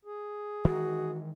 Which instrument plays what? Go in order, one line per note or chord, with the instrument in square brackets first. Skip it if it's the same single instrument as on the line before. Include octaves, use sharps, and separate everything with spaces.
[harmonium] G#4
[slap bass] D#3 E3 G#3 [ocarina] F#4